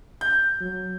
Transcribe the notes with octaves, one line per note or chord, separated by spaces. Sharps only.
G6
F#3